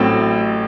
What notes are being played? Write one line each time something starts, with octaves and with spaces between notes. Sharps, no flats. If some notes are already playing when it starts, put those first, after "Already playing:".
Already playing: A1 A2 F#3 C4